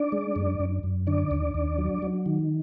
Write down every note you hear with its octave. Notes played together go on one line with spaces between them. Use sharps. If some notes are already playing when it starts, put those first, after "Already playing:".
Already playing: D4 D5
G#3
F#2
F#2
F#2
D3 D4 D5
D#2
D#2
F#3
F#3
D#3